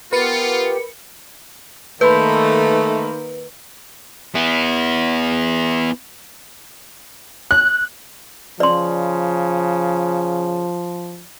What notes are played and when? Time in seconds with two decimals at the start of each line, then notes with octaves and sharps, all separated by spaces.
0.13 B3 F4 G4 A#4 B4 C#7
2.01 D#3 A3 A#3 D#4 B4 B5 C6 G6
4.35 B3 E4
7.51 F#6
8.60 C#3 F3 D5 C6